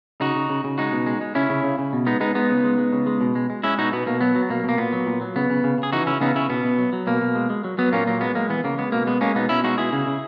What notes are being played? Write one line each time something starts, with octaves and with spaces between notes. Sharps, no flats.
C#3 D#4 F#4
C#3
C#3
C#3
G#3 D#4 F#4
B2
G#3
G#3
C#3 C#4 E4
C#3
C#3
C#3
B2
G#3 B3 D#4
G#3 B3 D#4
G#3 B3 D#4
C#3
G#3
G#3
C#3
G#3
B2
G#3
G#3
G#3 C#4 E4
B2 D#4 F#4
B2 B3
B2 A#3
F#3 B3
F#3
B2 A#3
B2 A#3
A#2 B3
F#3
A#2
F#3
C#3 B3
C#3
C#3
C#3
G#4
E3 D#4 F#4
C#3 C#4 E4
C#3 B3 D#4
C#3 C#4 E4
B2 B3
B2
F#3
F#3
B2 A#3
B2
G#3
G#3
F#3
F#3 B3
A#2 A#3 C#4
F#3 A#3
G#3 B3
G#3 A#3
E3 B3
C#3 A#3
G#3 B3
B2 A#3
G#3 B3
G#3 A#3 C#4
B2 B3 D#4
B2 C#4 E4
G#3 D#4 F#4
B2 E4 G#4
C#3
C#3